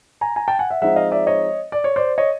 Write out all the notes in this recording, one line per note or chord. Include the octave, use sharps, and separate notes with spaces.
G#5 A#5
G#5 A#5
G5 A5
F#5 G#5
E5 F#5
F3 G#3 C4 D#4 E5 F#5
D#5 F5
D5 E5
C#5 D#5
D5
C#5
C5 D5
C#5 D#5